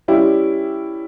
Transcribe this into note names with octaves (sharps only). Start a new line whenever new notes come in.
G3 C#4 E4 G4